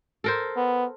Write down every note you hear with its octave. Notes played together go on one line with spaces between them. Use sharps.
A4 A#4 C5
B3